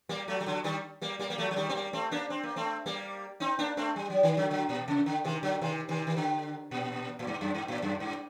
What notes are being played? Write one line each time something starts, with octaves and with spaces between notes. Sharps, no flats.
G3 A#3
F#3 A3
G3
D3 F#3
D#3 G3
G3 A#3
G3 A#3
A#3
F#3 A3
F#3
D#3 G3
C4
G3 A#3
A3 C4
A#3 D4
C4
A#3
A3 C4
G3 A#3
C4 D#4
A#3 D4
A3 C4
G3
F#3
D#3
D3 F#3
D3 F#3
A#2
C3
D3
C3 D#3
D3 F#3
C3 D#3
C3 D#3
D#3
D3
A#2
A2
G2
F#2
G2
A2
F#2
G2